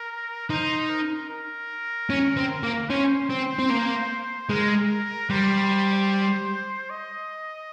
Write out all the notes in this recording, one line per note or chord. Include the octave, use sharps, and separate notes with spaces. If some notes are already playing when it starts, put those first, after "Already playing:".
Already playing: A#4
D#4 C5
A#4
A#4
C#4
C4
A#3
C#4 C5
C4
C4
A#3
G#3 A#4
G3 C5
D#5